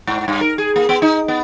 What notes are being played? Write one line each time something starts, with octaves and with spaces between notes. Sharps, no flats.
G#2
G2
A#4
G#4
A#3
B3
D#4
B3